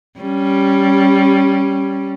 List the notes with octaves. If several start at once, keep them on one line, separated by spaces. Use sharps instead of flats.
G3 C#4